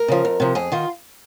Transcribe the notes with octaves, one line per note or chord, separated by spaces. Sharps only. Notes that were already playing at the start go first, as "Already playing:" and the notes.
Already playing: A#4
C#3 F3
F2
C3 F3
F2 G#4
D#3 F4